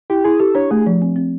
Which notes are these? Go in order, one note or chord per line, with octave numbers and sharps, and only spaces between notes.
E4 G4
E4 G#4
G4 A4
D4 C#5
A3 G#4
F3
C4
C4